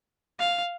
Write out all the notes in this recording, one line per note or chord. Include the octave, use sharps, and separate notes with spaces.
F5